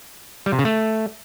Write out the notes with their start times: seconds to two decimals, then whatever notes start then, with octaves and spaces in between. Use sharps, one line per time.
0.46 G3
0.52 C3
0.59 C#3
0.65 A3